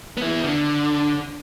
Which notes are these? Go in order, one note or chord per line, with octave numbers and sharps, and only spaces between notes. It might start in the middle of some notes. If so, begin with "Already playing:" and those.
B3 E4
D3